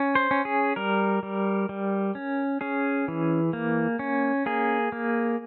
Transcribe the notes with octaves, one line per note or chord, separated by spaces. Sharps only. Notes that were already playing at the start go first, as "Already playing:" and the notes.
Already playing: C#4
C5
C#4
G#4
G3 A#4
G3
G3
C#4
C#4 G#4
E3
A#3
C#4
A#3 G#4
A#3